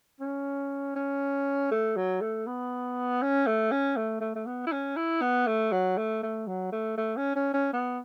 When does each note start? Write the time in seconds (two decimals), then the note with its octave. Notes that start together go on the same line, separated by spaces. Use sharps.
0.20 C#4
0.96 C#4
1.71 A3
1.96 F#3
2.21 A3
2.47 B3
3.22 C#4
3.46 A3
3.72 C#4
3.96 A3
4.21 A3
4.36 A3
4.46 B3
4.67 E4
4.72 C#4
4.97 E4
5.22 B3
5.47 A3
5.72 F#3
5.98 A3
6.23 A3
6.48 F#3
6.72 A3
6.97 A3
7.17 C#4
7.36 C#4
7.54 C#4
7.73 B3